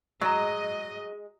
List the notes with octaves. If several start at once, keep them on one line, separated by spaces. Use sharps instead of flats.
F#3 G#3 F#4 D#5 A#5